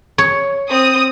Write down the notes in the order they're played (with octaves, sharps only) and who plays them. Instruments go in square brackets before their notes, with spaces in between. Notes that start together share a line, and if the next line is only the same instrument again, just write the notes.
[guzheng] C#5
[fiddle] C4 [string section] D#6